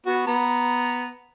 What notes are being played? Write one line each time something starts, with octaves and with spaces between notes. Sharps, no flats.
B3 F#4
B3 A#5